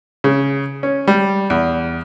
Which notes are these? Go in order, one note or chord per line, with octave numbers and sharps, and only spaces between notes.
C#3
C#4
G3
E2